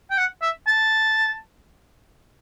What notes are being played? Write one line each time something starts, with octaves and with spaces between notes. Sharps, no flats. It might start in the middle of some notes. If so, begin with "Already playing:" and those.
G5
F#5
E5
A5